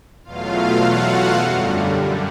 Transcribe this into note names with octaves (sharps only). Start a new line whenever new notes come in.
E2 B2 F#3 A3 F4 F5
F#4 F#5
F#2 D3 G3